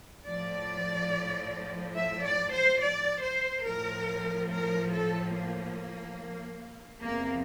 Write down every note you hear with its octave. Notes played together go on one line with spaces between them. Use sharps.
A2 F3 D5
E5
D5
C5
D5
C5
A2 F3 A#4
A#4
A4
A#3
E2 C3 F3 A#3